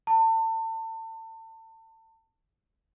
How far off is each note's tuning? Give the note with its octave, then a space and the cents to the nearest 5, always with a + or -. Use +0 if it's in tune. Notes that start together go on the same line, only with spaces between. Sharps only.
A5 +35